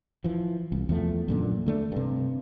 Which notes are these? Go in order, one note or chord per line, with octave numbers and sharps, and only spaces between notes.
E3 F3
C2
E2 F3 A3
F#2 A#2 D3
D3 A3 D4
G2 C3